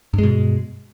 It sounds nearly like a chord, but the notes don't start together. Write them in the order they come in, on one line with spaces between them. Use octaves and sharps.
G2 G#3 B2